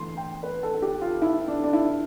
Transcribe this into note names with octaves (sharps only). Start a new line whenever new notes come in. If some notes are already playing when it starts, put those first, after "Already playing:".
Already playing: E3 A3 C6
G5
B4
A4
A4
G4
F4
E4
D4
D4
E4